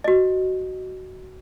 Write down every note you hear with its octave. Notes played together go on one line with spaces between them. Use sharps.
F#4 D#5